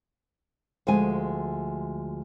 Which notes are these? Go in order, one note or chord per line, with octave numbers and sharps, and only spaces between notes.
D2 F3 G#3 G#5